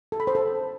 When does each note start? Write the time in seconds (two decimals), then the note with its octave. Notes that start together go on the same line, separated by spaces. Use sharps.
0.12 A4
0.20 B5
0.27 C5
0.35 A4